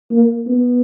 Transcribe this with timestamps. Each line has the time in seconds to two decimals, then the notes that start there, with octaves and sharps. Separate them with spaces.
0.11 A#3
0.47 B3